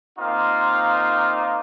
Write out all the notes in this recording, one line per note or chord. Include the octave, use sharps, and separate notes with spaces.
A#3 C4 D#4 F4 F5